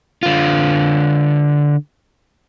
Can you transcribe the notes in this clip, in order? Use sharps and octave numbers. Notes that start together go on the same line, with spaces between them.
D3 F4